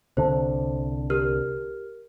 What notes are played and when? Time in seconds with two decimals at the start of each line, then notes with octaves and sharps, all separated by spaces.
0.17 C2 D3 C5
1.10 G4 A#4 F6